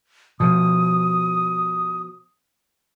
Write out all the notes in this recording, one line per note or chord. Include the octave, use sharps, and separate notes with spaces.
B2 F3 D#6